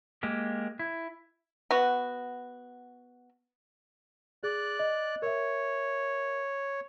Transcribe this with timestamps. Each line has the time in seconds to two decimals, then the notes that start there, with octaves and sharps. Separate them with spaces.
0.23 G#3 A#3 G4
0.79 E4
1.71 B3 F#4
4.44 G#4 D5 F#6
4.79 D#5
5.22 A#4 C#5 E5